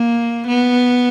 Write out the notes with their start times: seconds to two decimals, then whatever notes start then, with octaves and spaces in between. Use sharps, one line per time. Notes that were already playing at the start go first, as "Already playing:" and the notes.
Already playing: A#3
0.47 B3